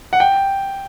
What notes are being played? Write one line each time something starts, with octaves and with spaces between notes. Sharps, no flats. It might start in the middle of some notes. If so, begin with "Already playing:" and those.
F#5
G5